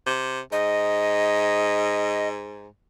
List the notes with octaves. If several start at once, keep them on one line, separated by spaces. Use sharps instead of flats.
C3
G#2 D#5